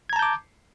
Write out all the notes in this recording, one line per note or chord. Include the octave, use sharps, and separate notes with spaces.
A5 A#5 D6 G6 G#6